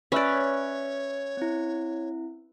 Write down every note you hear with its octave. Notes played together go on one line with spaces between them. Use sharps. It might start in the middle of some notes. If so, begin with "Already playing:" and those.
C#4 B4 C#5 D5 E5 F#6
C4 E4